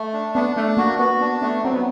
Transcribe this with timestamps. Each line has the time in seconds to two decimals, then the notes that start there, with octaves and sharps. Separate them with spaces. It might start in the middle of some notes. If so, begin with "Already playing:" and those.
Already playing: A3
0.13 D4
0.35 B3 D4
0.56 A3 D4
0.77 A#3 F#4
0.98 B3 F#4
1.21 B3 D4
1.41 A3 B3
1.63 F#3 C4
1.74 B3